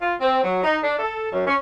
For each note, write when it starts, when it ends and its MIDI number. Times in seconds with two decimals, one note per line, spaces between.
0.02 0.15 65
0.21 0.39 60
0.44 0.63 54
0.64 0.79 63
0.84 0.99 62
0.99 1.30 69
1.33 1.44 42
1.47 1.55 61